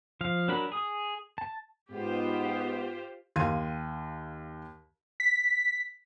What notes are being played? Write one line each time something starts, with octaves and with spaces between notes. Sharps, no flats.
F3 F5
F#3 D4 F#4 A#4 B5
G#4 D#6
A5
G#2 B3 F4 G4 C5
D#2 F5 C6 G#6 D#7
B6